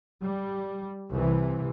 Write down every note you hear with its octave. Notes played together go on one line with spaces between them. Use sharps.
G3
C2 C3 E3